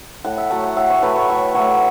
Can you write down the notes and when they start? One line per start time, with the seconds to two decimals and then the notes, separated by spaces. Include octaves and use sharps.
0.25 A2 F#5
0.38 E5
0.51 F#3 A3 F#5
0.64 F#5
0.76 A2 E5
0.90 C#5
1.03 F#3 A3 B4
1.16 C#5
1.29 A2 E5
1.55 F#3 A3 C#5